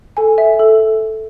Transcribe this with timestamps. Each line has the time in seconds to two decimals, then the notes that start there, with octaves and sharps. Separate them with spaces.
0.17 A4 G#5
0.38 E5
0.59 A4